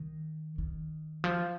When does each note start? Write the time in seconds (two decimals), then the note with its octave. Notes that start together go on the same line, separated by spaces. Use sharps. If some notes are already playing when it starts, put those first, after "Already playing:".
Already playing: D#3
0.58 D#3
1.24 F3